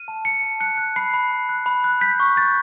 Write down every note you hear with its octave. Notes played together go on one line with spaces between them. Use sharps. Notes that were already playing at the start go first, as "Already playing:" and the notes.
Already playing: F6 D#7
A5
A5 C#7
A5
F#6 C#7
F#6
B5 C7
B5
B5
F#6
B5
F#6
G6 B6
C#6
G6 A6